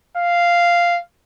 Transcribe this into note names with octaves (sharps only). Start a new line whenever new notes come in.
F5